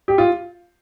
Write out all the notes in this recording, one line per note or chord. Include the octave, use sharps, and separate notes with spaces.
G4
F4